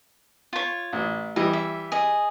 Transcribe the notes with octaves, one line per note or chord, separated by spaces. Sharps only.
F4 C#5
A1
E3 G3 D#5
E5
G#4 D#5